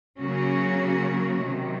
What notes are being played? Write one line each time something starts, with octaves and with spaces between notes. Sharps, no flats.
C#3 F#3 A#3 C#4 F#4
C3 D#3 F#3